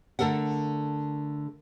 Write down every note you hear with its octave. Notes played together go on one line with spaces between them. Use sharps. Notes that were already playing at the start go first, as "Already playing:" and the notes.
D3 A3 A4 A#4 F#5